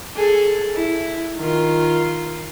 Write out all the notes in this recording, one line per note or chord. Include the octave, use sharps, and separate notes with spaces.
G#4 A4
E4
D#3 F4